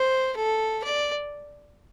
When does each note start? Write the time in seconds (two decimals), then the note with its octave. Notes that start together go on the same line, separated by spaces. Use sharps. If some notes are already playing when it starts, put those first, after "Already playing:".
Already playing: C5
0.36 A4
0.84 D5